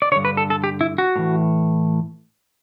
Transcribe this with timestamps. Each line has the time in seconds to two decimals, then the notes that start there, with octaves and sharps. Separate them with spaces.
0.02 D5
0.12 D3 C#5
0.16 G2
0.25 B4
0.37 A4
0.50 A4
0.64 G4
0.81 E4
0.98 F#4
1.16 A2 E3